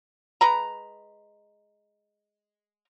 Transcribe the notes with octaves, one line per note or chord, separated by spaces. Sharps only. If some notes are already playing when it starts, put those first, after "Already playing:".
G#3 B4 A#5